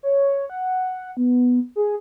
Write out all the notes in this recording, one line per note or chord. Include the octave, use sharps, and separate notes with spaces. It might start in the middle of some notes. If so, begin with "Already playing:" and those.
C#5
F#5
B3
G#4